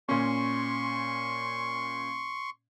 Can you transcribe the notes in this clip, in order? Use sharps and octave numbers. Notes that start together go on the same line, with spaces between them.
A#2 C#4 C6 C#6